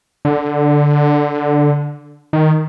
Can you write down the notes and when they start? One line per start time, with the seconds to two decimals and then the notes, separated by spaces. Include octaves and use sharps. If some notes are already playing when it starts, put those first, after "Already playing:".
0.25 D3
2.33 D#3